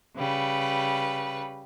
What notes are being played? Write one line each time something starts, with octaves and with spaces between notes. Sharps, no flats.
C#3 G3 B4